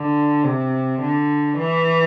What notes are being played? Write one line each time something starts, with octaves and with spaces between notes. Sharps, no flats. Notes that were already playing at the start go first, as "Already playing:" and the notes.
Already playing: D3
C3
D3
E3